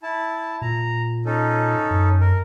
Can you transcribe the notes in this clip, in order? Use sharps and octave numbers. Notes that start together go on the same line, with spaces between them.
E4 A5
A#2 A#5
C#4 D#4 A4
F#2
A#4